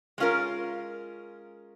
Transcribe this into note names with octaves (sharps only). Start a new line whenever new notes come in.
G#3 C#4 F4 A#4